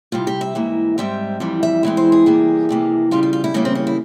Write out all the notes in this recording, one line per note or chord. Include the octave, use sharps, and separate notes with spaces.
C3 G3 C4 F4
G4
E5
G#2 E3 A#3
G#2 G3 C4 E5
F2 E3 G3
E5
E2 E3 G#3 C4
C5
G#4
C3 E3 G3 A#3
F2 C3 E3 A#3
E2 C#3 G3 F4
F4
F4
E4
E2 C#3 G3 A#3 C#4
C4
C#4
E4